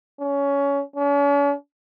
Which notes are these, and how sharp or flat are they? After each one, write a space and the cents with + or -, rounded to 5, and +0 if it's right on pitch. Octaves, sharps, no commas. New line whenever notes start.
C#4 +20
C#4 +45